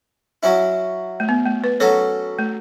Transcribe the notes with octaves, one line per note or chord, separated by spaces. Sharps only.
F#3 C#4 E4
A3
B3
A3
B4
F#3 C#4 A4 C#5
A3